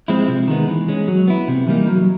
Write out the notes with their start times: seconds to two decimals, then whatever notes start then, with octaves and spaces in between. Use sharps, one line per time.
0.08 F3 G#3 C4 E4
0.28 C3
0.48 D#3 G#3 B3
0.68 E3
0.88 G#3 C#4
1.08 F#3
1.28 B3 E4
1.48 C3
1.67 E3 G3 A#3 D#4
1.87 F#3